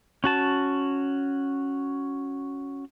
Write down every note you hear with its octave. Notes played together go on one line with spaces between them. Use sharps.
C#4 F#4 A5